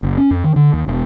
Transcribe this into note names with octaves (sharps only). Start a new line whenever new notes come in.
F#1
C#4
F2
D#3
D3
D#2
E1